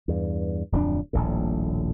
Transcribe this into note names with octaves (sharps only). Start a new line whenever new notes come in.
E2 G2
D1 F2 G3 D4
D#1 A#1 A2